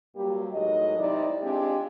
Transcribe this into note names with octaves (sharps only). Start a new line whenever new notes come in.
G2 F#3 G3 A#3 G4
A2 D#3 F#3 G#3 D#5
C3 D#4 E4 D5
G#3 C4 D4 F4 G4